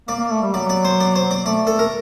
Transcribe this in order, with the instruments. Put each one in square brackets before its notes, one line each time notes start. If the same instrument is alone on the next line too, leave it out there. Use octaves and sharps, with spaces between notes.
[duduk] A#3 [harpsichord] D5
[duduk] A#3
A3
G3
[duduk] F#3 [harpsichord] D5
[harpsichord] D5
C5
D5
C5
D5
[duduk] A3 [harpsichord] D5
[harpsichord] A4
A#4